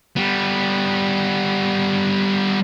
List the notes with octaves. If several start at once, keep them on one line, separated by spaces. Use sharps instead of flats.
G3 B3